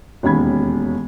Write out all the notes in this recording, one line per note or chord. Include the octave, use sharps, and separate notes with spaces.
E1 D#2 C#4 B5 G#6